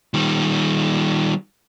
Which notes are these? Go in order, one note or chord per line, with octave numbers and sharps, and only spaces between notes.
D#3 G3